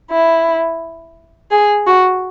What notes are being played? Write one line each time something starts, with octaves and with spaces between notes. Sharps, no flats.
E4
G#4
F#4